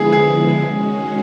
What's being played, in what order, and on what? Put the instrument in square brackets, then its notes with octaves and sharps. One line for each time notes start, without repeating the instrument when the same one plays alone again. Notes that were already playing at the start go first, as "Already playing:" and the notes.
Already playing: [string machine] D3 F3 G#3 B3 E4 [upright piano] G#4
[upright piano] G#4
[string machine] D#3 G#3 C#4 F#4